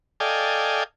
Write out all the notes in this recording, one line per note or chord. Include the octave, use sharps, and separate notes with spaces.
A4 D5 D#5 F5 G5 G#5